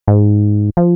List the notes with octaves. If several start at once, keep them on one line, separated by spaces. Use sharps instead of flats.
G#2
F3